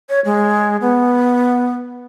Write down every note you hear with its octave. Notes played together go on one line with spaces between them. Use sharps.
C#5
G#3
B3